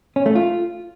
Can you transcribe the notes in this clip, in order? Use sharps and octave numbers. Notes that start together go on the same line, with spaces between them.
C#4
A3
F4